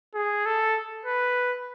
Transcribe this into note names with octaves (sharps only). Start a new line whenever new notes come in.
G#4
A4
B4